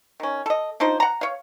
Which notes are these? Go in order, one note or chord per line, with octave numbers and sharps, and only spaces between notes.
D#3 C#4
A4 D#5
D4 D#4 F4 C5
F#5 A#5
C#5 F5